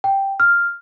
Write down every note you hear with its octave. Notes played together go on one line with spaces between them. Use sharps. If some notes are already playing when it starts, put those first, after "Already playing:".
G5
F6